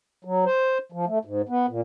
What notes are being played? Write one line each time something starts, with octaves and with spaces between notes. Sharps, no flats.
F#3
C5
F3
A3
G#2
B3
A#2